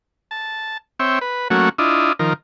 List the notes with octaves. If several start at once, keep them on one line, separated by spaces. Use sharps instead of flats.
A5
C4 C#5 E5 G5
B4
F#3 A3 A#3 C#4 F#4
D4 E4 F4 D#5
D#3 F3 A#4